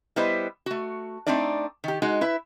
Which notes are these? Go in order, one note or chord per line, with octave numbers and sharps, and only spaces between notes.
G3 B3 E4 B4 C5 D#5
A3 F#4
A3 A#3 C4 D4 D#4 D5
D#3 G4
G#3 D#4 F#4
E4 B4 E5